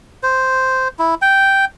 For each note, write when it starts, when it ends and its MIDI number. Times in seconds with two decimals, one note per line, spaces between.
0.23 0.88 72
0.99 1.15 64
1.22 1.65 79